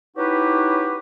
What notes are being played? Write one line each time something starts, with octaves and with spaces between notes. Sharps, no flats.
C#4 D#4 E4 F#4 G4 B4